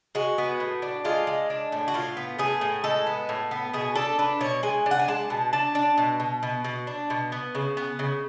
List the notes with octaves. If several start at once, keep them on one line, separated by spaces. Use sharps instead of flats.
G#3 F#4
B3
A2
D4
G#3 F4
G#3
D4
A2
F#4
A2 F4
B3
A2 G#4
A2
G#3 A4
B3
A2
B3
B2 G#4
D4 A4
D4 B4
B2 C#5
G#3 G#5
D4
F#5
G#5
G#3 A5
B2
D4 A5
D4
B2
B2
B2
B2
D4
B2
B3
C#3
B3
C#3